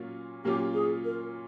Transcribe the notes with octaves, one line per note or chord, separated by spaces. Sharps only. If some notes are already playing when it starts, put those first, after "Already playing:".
Already playing: A#2 F#3 A#3 C#4 F4
A#2 F#3 A#3 C#4 F4 G4
G#4
A#4